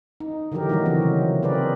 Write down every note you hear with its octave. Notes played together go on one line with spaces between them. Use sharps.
D#4
D3 E3 F#3 G4 A#4
D#3 E3 G3 A#3 D#4 F#4
C#3 E3 F#3 C4
C3
C4 F4 G#4 A#4 B4 D5